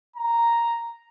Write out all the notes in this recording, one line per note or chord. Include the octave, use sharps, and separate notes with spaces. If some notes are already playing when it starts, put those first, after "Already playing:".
A#5